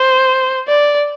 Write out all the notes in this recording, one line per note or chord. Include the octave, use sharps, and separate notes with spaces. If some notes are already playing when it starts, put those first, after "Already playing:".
Already playing: C5
D5